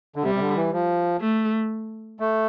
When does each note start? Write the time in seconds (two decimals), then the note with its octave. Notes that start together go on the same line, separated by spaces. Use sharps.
0.16 D3
0.23 C3 G3
0.35 C3
0.40 D3
0.56 E3
0.73 F3
1.21 A3
2.20 A3